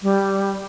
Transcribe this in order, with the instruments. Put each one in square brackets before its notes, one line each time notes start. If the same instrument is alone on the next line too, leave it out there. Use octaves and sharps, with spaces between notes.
[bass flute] G3